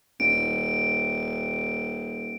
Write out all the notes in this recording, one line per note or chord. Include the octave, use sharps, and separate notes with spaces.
D#1 D7